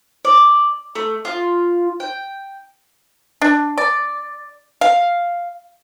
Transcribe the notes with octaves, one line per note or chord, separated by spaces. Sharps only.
D5
A3
F4
G5
D4
D5
F5